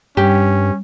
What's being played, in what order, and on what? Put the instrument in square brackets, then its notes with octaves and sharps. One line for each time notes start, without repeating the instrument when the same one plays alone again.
[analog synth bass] G2 [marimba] G3 [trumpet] C#4 [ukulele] G4